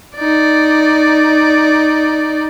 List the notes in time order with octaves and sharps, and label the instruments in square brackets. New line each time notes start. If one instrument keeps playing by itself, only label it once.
[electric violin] D#4 D5